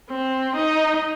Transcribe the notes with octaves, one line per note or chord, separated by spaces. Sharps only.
C4
D#4